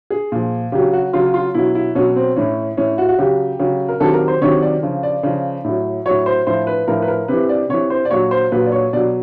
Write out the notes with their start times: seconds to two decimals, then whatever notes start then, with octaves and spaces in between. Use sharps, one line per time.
0.10 G#4
0.32 A#2 F3
0.72 C#3 F#3 G4
0.93 F#4
1.13 C#3 F#3 F4
1.34 F4
1.54 B2 F#3 E4
1.75 E4
1.95 B2 F#3 C#4
2.16 C4
2.36 A2 E3 C#4
2.77 A2 E3 C#4
2.98 F#4
3.08 F#4
3.18 C#3 F#3 G4
3.59 C#3 F#3
3.89 A#4
4.00 C3 D#3 F#3 A4
4.14 A#4
4.28 C5
4.41 C3 D#3 F#3 C#5
4.62 D5
4.83 C#3 F3
5.03 D5
5.23 C#3 F3
5.64 A2 F#3
6.06 A2 F#3 C#5
6.26 C5
6.47 A2 F3 C5
6.67 B4
6.87 A2 F3 A#4
7.02 B4
7.08 A#4
7.28 C3 E3 B4
7.49 D5
7.69 C3 E3 C#5
7.90 C5
8.05 D5
8.11 A#2 F#3 C#5
8.31 C5
8.52 A#2 F#3 B4
8.66 D5
8.72 C#5
8.93 B2 F#3 D5